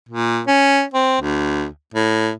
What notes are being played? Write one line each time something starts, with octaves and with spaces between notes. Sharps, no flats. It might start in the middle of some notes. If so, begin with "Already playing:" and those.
A#2
C#4
C4
D2
A2